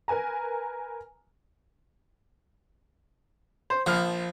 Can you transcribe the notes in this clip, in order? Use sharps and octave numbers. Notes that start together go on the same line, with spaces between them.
A#4 B4 G#5 A#5
C5
A#1 F3 F6